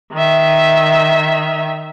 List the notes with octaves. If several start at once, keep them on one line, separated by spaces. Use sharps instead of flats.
D#3 E5